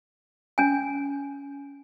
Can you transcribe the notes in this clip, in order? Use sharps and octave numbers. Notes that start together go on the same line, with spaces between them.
C#4 G#5